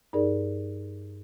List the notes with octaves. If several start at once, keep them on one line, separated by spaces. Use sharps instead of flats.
G2 D#4 G#4 A#4 D5